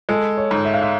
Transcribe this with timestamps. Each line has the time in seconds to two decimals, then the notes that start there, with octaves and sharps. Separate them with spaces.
0.09 G#3 A4
0.38 C#5
0.51 G#2
0.65 E5
0.73 F5
0.82 E5